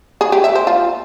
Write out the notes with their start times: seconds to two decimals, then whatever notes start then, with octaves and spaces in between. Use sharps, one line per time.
0.21 G#4
0.32 G4
0.44 E5
0.55 C5
0.67 F4